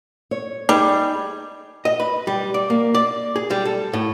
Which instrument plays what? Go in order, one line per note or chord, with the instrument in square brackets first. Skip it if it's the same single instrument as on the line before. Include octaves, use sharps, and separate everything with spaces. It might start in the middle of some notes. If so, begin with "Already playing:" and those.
[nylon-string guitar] C#5
[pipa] G3 [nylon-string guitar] D#4 G#4
[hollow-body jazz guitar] D#5
B4
G3
D5
A#3
D5
G#4
G3
A4
A2